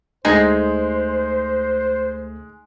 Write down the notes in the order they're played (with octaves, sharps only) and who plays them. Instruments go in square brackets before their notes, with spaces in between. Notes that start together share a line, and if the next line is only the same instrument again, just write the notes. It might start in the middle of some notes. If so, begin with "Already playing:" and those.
[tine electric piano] D2 A3 [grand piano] G#3 [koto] D#4 G#4 [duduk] C5